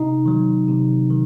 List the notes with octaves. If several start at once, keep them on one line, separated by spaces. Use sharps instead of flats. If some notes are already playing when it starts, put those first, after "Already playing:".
Already playing: C3 D#4
D#3 F#3
C3
D#3